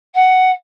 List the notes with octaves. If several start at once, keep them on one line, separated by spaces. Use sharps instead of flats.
F#5